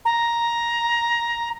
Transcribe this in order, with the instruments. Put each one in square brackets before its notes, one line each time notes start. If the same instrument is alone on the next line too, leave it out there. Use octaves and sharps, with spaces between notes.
[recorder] A#5